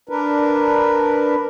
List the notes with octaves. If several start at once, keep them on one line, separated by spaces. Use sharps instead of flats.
D4 A#4 B4